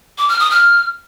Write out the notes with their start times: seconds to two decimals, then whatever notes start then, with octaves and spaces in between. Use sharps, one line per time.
0.18 D6
0.29 F6
0.40 D#6
0.51 F6